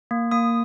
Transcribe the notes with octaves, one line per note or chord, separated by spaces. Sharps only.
A#3
A#3 D#6